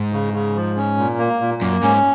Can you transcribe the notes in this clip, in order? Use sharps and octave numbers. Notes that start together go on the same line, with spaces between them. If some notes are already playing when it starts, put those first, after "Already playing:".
Already playing: G#2
C#3
C#3
F3
C#4
A#2
A#3
A#2
F#2 A#3
G#2 C#4